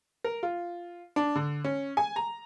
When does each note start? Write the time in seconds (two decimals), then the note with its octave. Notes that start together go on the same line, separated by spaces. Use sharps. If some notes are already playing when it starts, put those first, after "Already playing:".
0.24 A#4
0.43 F4
1.16 D4
1.36 D3
1.65 C#4
1.97 G#5
2.16 A#5